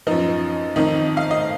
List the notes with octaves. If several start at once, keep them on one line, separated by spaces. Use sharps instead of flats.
F#2 F3 D#4
F2 D#3 D#4
F5
D#5